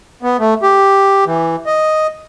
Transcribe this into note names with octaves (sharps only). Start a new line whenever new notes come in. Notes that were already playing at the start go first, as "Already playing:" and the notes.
B3
A3
G4
E3
D#5